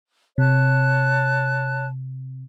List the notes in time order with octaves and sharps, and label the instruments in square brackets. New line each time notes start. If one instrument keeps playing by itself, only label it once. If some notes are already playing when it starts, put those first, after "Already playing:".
[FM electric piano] C3 [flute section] C#5 A5 F#6